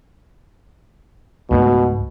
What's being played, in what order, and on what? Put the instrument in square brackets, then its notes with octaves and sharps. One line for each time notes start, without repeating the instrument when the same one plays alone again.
[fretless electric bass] C#2 G#2 A3 [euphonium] B2